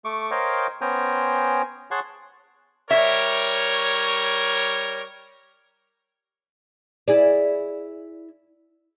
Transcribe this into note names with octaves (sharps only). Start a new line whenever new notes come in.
A3 C#6 D6
A#4 C5 C#5 D#5 F5 G5
B3 C#4 C5 G5 G#5 A#5
G#4 C#5 F#5 A5 C6 C#6
G3 A#4 C#5 E5
E4 G#4 D5